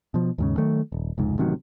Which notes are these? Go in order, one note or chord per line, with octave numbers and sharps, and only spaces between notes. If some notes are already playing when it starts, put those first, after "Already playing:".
B2 F3
D#2 G#2 C#3
D#3 F#3 A3
D#1
F1 C#2 G#2
A1 C3 D#3 F#3